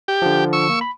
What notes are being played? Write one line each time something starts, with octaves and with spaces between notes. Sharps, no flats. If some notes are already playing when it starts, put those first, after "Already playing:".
G4
D3 F3
C#6 E6
A#3
B5